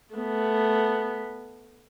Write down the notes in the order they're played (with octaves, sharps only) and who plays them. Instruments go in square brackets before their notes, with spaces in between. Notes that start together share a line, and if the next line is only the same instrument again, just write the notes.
[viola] A3 B3